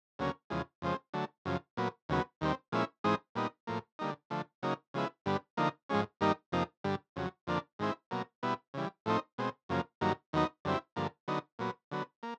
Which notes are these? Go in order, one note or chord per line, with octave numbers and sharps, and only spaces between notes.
D2 C#3 F#3 A#3 C#4
E2 C#3 F3 G#3
F2 C#3 F3 G#3 C4
D3 F#3 A3
F#2 C#3 F3
A#2 F#3 B3
D#2 C#3 F#3 B3
D#2 D#3 G3 C4
A#2 F3 G#3 C#4 E4
G#2 E3 G#3 C4 D#4
A#2 G3 B3 D#4
A2 F3 A#3
D3 G3 A#3 D#4
D3 F3 A3
C#3 F#3 A#3 D#4
C#3 F3 G#3 B3 E4
G2 D3 G3 B3
D3 F3 A#3 D#4
G#2 F3 G#3 C#4
G2 D#3 G3 A#3 D#4
F2 C3 F3 A#3 D#4
G2 D3 G3
F2 C#3 F#3
F2 D3 F3 A#3 D4
G#2 D#3 G#3 C4 E4
B2 F#3 A#3
B2 G3 B3 E4
C#3 E3 G3
A2 F3 A3 C4 D#4
B2 G#3 C4
F#2 C#3 F3 A#3
G2 D#3 F#3 A#3
D#2 D#3 F#3 B3 D#4
F#2 D3 G3 C4 E4
G2 D3 F3 A#3
D3 F#3 B3 D#4
A#2 F#3 B3
D3 F#3 B3
A#3